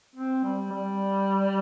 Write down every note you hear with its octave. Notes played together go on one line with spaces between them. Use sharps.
C4
G3
G3